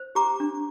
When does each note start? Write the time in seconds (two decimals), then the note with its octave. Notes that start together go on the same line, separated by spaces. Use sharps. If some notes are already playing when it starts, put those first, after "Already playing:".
Already playing: C5
0.15 G4 A#5 D6
0.40 D4